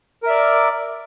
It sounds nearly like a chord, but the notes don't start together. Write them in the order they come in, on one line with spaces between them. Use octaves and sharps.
A#4 E5 D5